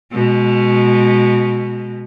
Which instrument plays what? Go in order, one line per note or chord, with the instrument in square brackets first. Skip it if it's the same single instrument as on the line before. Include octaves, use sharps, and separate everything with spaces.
[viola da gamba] B2 G#3